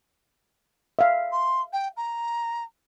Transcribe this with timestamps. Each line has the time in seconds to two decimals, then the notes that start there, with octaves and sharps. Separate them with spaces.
0.99 E5 F5
1.31 C6
1.72 G5
1.96 A#5